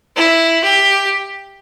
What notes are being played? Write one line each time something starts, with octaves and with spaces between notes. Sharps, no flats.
E4
G4